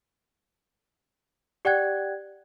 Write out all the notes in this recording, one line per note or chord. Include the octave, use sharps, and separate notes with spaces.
G4 D5 F#5 G5 F#6 G#6